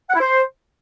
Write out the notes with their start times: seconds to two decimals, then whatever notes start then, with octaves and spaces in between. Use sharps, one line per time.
0.10 F#5
0.15 E4
0.21 C5